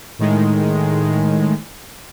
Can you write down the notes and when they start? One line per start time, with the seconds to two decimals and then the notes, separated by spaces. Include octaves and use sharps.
0.19 A2 D#3 G#3